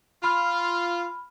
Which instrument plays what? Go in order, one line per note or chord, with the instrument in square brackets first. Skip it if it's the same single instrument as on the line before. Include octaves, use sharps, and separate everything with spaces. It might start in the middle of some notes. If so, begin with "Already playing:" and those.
[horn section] F4 [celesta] B5 F6